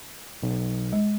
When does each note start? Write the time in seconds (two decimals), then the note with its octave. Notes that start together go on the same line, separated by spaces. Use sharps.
0.43 B1
0.93 G#3